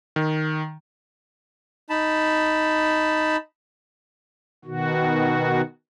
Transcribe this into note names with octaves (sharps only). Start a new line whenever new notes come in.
D#3
D#4 A5 B5
B2 D#3 F#4